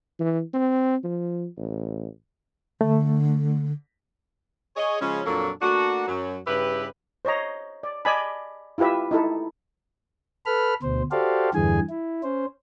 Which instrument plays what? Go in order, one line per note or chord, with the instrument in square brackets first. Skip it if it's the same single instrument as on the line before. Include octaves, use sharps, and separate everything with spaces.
[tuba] E3
C4
F3
A1
[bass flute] D3 [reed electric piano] A3
[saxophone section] G#4 C#5 D#5
C#3 F3 G#3 C#4
F2 A#2 F#3 A#3 D4 A4
A3 A#3 D4 F#4
F#2 F#3
G2 C#3 E4 G4 B4
[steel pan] C5 C#5 D#5 A#5
D5
D5 D#5 G#5 A5 B5
E4 F4 G4 B4 E5
D#4 E4 A4
[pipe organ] A4 B4 B5 F6
D2 B2 C5
F#4 G4 A4 C5 D5 F5
E2 G2 D3 E3 G#4 G#5
E4
C#4 C5